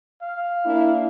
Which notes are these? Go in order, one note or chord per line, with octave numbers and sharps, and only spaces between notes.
F5
A#3 D4 E4